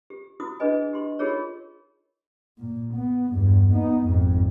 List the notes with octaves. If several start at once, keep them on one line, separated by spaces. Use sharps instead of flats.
G4
E4 F#4 D#6
D4 G#4 B4 D#5 G#5
G4 C6
D#4 F4 G4 G#4 A#4 C#5
A#2
B3
E2 G2
B3 D#4
G#1 F2